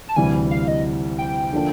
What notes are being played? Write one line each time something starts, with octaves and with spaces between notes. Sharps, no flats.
A5
D2 C3 E3 G3 G#5
F5
D#5
G5
D3 F3 A#3 D4